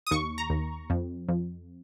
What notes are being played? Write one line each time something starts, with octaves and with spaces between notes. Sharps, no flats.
D#6
D#2 C#6
A#5
D#2
F2
F2